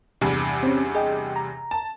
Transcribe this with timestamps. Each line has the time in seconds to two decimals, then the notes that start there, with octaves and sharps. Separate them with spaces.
0.21 E2 G2 C3
0.63 C4 C#4
0.95 G#4 D#5 G5
1.36 A#5
1.71 A5